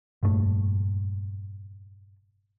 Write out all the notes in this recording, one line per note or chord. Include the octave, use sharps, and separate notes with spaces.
F1 G2 A#2 A3